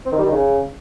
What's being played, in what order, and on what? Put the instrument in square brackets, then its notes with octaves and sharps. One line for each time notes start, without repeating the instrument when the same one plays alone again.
[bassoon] C4
D#3
G3
D#3
C#3